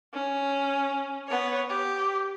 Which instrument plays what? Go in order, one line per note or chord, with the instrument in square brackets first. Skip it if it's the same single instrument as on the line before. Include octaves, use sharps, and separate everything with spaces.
[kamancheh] C#4
B3 C#5
G4